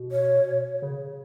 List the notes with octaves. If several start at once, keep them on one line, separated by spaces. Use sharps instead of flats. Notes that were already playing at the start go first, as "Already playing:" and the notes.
Already playing: B2
C#5
C#3